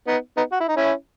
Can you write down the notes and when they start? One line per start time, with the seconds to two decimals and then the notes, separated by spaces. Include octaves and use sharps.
0.07 B3 D#4
0.37 B3 D#4
0.52 F#4
0.60 E4
0.68 D#4
0.77 C#4 E4